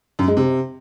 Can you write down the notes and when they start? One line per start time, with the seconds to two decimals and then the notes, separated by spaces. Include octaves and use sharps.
0.19 F#2
0.28 G#3
0.37 C3